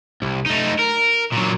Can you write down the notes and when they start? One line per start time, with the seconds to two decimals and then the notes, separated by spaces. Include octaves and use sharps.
0.22 C2
0.46 A3 D#4
0.79 A#4
1.33 A#2 F#3